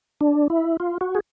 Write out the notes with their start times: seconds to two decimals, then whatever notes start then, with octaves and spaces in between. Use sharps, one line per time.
0.21 D4
0.50 E4
0.80 F4
1.01 F#4
1.15 G#4